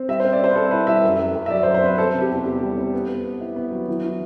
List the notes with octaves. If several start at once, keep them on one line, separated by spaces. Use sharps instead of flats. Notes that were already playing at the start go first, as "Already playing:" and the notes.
Already playing: C4
G3 E5
C5
C4
D5
C4 C5
B4
G3 A4
E4 B4
G3 E5
F#2
F#2
F#2
E5
F#3 D5
C5
F#2
C5
C4 B4
C4 A4
C3
G4
E2
E2 G4
G3
C4
B3
B3
B3
E4
B3
F#3
E3
E3